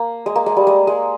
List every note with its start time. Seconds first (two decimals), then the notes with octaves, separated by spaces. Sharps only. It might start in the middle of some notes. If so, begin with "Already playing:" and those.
Already playing: A#3
0.26 G#3
0.35 A#3
0.46 G#3
0.57 G3
0.67 G#3
0.87 G#3